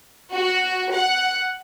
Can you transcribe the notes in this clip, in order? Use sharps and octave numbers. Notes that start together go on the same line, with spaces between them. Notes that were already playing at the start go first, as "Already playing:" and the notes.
F#4
F#5